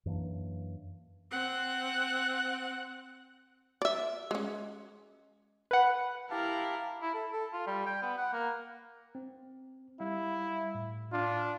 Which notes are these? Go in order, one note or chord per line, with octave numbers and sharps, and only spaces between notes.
F#2 E3 A#3 D4
C4 F#5
D5 E5
G#3 C#4
B4 F#5
E4 G4 A#4 F5 A5
E4
A4
A4
F4
G3
G5
B3
F#5
A#3
C4
G3 E4 F5
A2
D4 F4